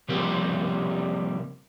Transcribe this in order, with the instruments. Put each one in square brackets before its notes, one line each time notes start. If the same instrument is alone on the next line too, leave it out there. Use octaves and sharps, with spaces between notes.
[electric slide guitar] C3 F3 G3 A#3 C4 G4